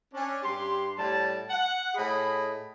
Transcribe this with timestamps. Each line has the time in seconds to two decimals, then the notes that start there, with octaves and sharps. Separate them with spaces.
0.12 C#4 D4
0.42 G2 G4 C6
0.97 A2 G3 A5
1.49 F#5
1.94 A2 G#4 D#5 B5